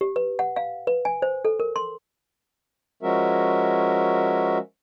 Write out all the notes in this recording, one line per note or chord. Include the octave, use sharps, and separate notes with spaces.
G4
B4
F#5
F5
B4
G#5
C5
A4
A#4
C6
F3 G#3 C#4 F#4 A#4 E5